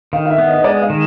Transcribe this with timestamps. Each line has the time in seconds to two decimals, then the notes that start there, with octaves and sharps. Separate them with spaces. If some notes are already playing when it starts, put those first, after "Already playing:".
0.13 D#3 F5
0.25 F5
0.30 E5
0.38 B3
0.47 D#5
0.58 D#5
0.64 G#3 D5
0.82 F5
0.90 D#3